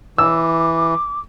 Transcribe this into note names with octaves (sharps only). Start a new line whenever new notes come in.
E3 D6 E6